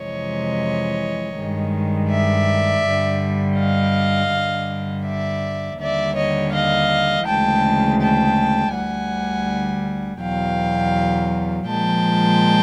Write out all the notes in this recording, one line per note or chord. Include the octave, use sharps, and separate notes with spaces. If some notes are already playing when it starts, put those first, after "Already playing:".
Already playing: F2 C3 E3 G#3 C#5 D#5
G2 D#3 G#3
D5 E5
G2 D3 G3
D#5 F5
G2 D3 G3
D5 E5
D#2 D3 G3 D5 E5
C#5 D#5
D#5 F5
D2 C#3 E3 G#3 G5 A5
G5 A5
D2 D3 G3 F#5 G#5
E2 B2 F#3 F5 G5
A#2 F3 G#3 G5 A5